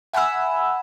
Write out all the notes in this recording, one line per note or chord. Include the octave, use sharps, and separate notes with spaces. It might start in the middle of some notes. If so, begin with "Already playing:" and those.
E5 F#5 G#5 B5 E6